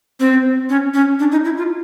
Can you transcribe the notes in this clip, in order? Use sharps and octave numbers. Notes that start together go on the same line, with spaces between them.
C4
C#4
C#4
D4
D#4
E4
F4